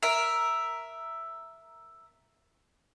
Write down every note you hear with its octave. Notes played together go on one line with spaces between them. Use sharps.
A#4 E5